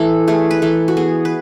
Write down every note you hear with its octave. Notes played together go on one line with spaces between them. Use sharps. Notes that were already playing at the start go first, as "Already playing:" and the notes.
Already playing: E3 A3 A4
A3 G#4
B4
E3 A4
F#4
B3 G#4
B4